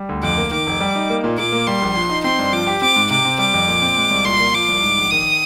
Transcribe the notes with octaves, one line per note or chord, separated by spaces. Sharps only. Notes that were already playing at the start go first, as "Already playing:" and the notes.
Already playing: G3
D2
F2 D6
A#3
D#3 D6
F1
G3
D#4
A#3
A#2
A#2 D6
A#3
G3 C6
A#1
F3
D#4
C4 C6
G2
F3 D6
G4
C4 D6
G#2
C3 D6
C4
G3 D6
F2
A#2
C4
G#3
C2
A#2 C6
A#3
F3 D6
C2
G#2
A#1
D#3 D#6